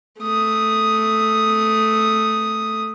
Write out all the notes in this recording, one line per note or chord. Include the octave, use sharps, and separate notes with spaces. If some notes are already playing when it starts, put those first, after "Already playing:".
A3 D#6